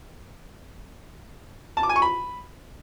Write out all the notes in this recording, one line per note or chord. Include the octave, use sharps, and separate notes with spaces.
A5
D6
G#5
C#6
B5